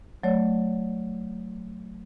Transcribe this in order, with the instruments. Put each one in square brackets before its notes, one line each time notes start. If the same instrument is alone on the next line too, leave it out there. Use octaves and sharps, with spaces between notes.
[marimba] F#3 A3 C#5 D5